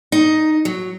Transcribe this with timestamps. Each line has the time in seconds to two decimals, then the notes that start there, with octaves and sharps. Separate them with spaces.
0.12 D#4
0.65 F#3